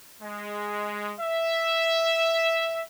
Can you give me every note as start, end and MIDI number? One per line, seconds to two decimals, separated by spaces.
0.22 1.13 56
1.19 2.81 76